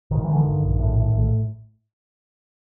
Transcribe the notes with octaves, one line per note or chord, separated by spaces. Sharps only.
G#1 D#3
D3 E3
D#3
G2
A#1
A2
A2
A#1 A3